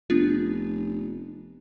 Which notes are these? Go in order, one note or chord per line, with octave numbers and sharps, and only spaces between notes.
F1 B3 D4 F4